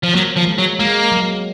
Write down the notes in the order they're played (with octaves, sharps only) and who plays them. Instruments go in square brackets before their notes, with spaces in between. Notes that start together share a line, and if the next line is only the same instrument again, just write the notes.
[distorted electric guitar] F3
[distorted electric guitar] F#3 [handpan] A#3
[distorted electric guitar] F3
[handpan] G#3
[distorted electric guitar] F#3
[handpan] G#3 [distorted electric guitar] A#3
[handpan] F#3